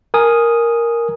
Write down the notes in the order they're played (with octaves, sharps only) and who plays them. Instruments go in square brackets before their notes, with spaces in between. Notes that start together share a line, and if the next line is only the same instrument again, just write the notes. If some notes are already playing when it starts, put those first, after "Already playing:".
[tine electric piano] A#4 G#5 D#6